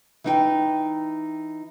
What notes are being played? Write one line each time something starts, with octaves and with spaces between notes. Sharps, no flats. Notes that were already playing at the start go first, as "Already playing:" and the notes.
E3 D#4 G5